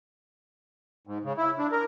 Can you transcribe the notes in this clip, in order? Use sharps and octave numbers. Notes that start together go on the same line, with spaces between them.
G#2
C#3
E4
D4
A#4